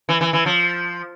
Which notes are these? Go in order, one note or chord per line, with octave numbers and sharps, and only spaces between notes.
E3
E3
E3
F3